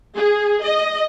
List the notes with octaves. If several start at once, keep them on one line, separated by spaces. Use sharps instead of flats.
G#4
D#5